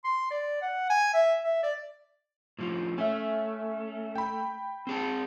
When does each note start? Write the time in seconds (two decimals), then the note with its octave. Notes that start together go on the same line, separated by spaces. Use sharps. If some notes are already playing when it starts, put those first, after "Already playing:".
0.05 C6
0.31 D5
0.62 F#5
0.90 G#5
1.14 E5
1.44 E5
1.63 D5
2.59 A2 F3
2.98 A3 C#4 E5
4.16 G5 B5
4.87 C4 G#4 A5